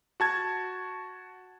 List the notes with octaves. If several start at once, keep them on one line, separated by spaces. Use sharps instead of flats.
F#4 A5 G#6